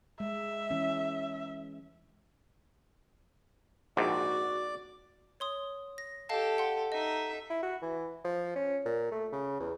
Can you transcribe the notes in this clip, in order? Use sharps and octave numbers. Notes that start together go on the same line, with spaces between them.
G#3 E5
E3 C#4
A#1 G#2 F#4 D5 D6
C#5 C6 D#6
A#6
G4 A4 D#5 F5 A5
F#5 C6
D#4 D#5 E5
E4
F#4
E3
F3
C#4
A#2
A3
C#3
E2